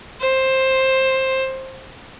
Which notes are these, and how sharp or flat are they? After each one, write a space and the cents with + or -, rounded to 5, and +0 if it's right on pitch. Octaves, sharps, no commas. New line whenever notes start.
C5 +15